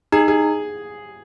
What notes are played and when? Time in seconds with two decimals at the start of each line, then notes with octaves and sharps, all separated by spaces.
0.12 D#4 G#4
0.28 G#4